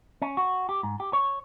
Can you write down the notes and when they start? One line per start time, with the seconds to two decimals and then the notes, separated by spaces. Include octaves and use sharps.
0.22 C#4
0.37 F#4
0.69 G4
0.83 G#2
1.00 G4
1.13 C#5